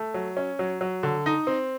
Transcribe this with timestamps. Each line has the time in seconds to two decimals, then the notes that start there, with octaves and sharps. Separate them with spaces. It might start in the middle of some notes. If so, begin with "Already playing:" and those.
Already playing: A3
0.14 F#3
0.37 C#4
0.59 F#3
0.81 F#3
1.03 D3
1.26 D#4
1.47 C4